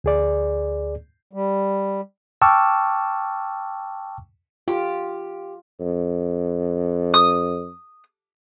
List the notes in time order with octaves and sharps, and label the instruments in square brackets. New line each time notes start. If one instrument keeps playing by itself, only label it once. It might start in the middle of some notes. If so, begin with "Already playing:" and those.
[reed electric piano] D2 G#4 D5
[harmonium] G3
[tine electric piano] G5 A5 C#6 D6 E6 F6
[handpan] F4 [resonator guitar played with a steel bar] G4
[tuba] F2
[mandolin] D#6